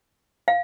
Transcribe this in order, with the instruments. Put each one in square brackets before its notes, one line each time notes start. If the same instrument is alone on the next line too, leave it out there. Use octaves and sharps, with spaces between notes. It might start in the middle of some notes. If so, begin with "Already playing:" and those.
[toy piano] F5